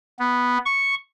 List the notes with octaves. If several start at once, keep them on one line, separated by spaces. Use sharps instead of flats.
B3
C#6